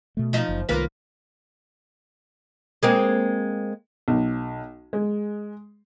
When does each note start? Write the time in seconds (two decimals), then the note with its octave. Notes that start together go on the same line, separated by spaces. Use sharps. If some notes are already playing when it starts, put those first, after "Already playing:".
0.17 B2 A3
0.33 F3 D#4
0.49 F#1
0.69 C2 D#3 A#3 F4 B4
2.83 G#3 A#3 C4
4.08 B1
4.93 G#3